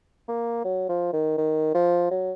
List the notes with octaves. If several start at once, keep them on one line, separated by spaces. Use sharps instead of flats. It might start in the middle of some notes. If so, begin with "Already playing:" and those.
A#3
F#3
F3
D#3
D#3
F3
F#3